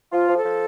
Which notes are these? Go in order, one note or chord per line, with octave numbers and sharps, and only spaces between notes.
F3 F4
F3
A4
F3